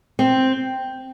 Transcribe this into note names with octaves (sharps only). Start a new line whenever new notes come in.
C4